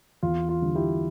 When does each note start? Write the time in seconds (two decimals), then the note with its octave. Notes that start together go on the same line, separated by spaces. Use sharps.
0.23 E2 F4
0.49 F4
0.62 D3 G3
0.75 E4 G4